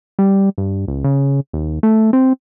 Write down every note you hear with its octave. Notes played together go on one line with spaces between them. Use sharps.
G3
G2
C#2
C#3
D#2
A3
C4